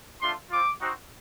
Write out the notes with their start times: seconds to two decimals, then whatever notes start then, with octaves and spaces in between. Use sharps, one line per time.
0.21 A3 D4 F4 C6
0.50 C4 F4 D6
0.80 C4 D#4 F#4